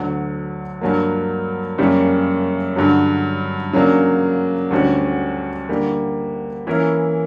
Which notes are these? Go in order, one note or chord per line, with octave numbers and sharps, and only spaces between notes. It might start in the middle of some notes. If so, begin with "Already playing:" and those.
Already playing: D2 D3 F#3
G2 F#3 A#3
F#2 C#3 G3 A#3
G2 D3 F#3
C#3 F#3 A#3 D4
D2 D3 G3 C#4 F#4
D3 G3 A#3
E3 A#3 C#4 E4 A#4